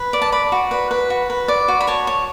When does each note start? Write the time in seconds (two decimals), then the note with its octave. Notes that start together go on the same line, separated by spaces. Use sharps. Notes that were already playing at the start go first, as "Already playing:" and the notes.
Already playing: B4
0.13 D5
0.22 A5
0.32 D5 B5
0.52 F#4
0.71 B4
0.91 B4
1.10 F#4
1.30 B4
1.48 D5
1.68 F#4
1.81 B5
1.87 C#5 A5
2.07 C#5